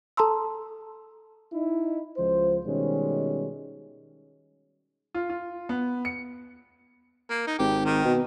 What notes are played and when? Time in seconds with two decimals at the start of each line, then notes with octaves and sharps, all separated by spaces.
0.17 A4 A5 A#5 C6 E6
1.53 D#4 E4
2.17 C#2 F3 C5
2.66 B2 D#3 G3 G#3 C#4
5.15 F4
5.30 F4
5.69 B3
6.05 C#7
7.30 A#3
7.47 D#4
7.59 G#1 G4
7.85 D#3
8.04 B2